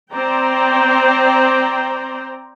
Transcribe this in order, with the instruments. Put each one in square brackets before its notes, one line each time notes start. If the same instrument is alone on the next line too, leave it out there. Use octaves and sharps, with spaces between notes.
[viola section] C4 C5 D5 G5 A#5